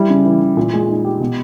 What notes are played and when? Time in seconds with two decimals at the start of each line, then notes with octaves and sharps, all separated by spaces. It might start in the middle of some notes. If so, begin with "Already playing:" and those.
Already playing: G3 E4
0.10 C#3
0.25 E3
0.41 E3
0.57 A#2
0.73 G#3
0.89 D#4
1.05 G4
1.20 B2